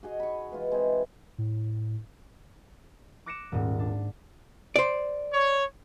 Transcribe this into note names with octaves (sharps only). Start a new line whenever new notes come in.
F#4 G#4 D#5
B5 C#6
E3 G#3 F4
G#3 C4 E4
A2
D6 F#6 A#6 C#7 D7 E7
D#1 G#2
D4
C5 D5
C#5